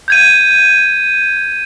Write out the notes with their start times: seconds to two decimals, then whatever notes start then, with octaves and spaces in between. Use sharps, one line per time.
0.08 G6 G#6 D#7